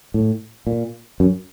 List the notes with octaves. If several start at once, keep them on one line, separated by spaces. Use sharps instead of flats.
A2
A#2
F#2